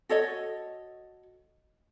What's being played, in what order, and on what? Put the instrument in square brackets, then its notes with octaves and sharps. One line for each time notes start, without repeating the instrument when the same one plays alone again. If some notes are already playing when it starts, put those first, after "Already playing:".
[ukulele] F#4 A4 C#5 D#5